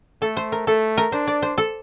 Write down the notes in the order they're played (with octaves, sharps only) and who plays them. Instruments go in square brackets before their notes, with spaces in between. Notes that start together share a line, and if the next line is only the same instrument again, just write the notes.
[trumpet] A3 [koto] A4
[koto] C5
A#4
[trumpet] A3 [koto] A4
[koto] A#4
[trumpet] D4 [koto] C5
[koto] D5
C5
A4